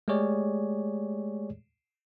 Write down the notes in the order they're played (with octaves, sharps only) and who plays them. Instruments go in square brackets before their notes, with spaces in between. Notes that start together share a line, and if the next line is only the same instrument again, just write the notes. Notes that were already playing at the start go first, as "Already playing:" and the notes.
[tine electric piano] G#3 A3 G4 G#4 C#5 D5